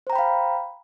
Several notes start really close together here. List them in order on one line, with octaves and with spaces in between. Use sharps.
C5 A#5 G5 B5 F5